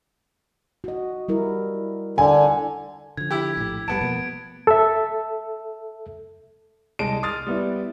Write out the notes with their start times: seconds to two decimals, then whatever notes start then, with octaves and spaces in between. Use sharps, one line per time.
0.84 F#4 D#5
1.28 G3 E4 A#4
2.18 D3 G#5
3.17 D3 F3 G#6
3.31 E4 G4
3.57 A#1 A2
3.88 F#1 G3 B3 A5 D7
4.01 B2 F3 A#3
4.67 A4 E5
6.99 C2 G#3 D#5 A5 D7
7.23 C6 D#6 F6 A6
7.47 G3 B3 E4